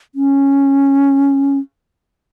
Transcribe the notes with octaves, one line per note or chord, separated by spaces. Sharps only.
C#4